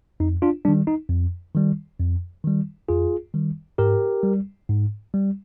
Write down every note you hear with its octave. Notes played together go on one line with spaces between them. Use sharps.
F2 D#4
D4 F4
D#3 G3 D4
D#4
F2
D#3 G3
F2
D#3 G3
F2 F4 G#4
D#3 G3
G#2 G4 A#4
G3
G#2
G3